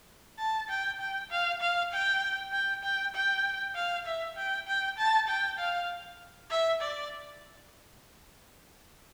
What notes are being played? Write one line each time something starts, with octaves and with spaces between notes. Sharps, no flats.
A5
G5
G5
F5
F5
G5
G5
G5
G5
F5
E5
G5
G5
A5
G5
F5
E5
D5